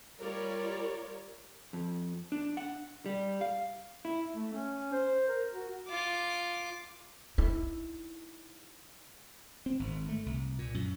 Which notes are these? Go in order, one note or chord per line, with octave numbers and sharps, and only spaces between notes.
G3 F4 A#4 C#5 D5
F2
D4
F#5
G3
F5
E4
A3
C#4
C5
A#4
F#4
F4 D6
D#4 E4
C4
G#1
A3
C2
A#2
F#2